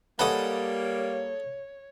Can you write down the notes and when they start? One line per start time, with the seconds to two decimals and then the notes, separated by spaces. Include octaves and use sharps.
0.19 G3 G#3 A#3 F#4 A4 B4 C#5 D#6